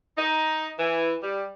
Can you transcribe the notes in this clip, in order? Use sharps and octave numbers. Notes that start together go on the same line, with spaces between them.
D#4
E3
G3